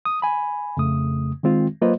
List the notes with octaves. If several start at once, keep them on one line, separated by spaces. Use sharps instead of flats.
D#6
G#5 B5
F2 C#3 A3 D#6
D#3 G#3 C4 F4
F#3 A#3 F4 B4 C5 D#5